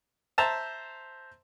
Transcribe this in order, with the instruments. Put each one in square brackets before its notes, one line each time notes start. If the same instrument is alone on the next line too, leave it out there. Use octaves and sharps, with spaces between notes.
[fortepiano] C5 E5 A5 A#5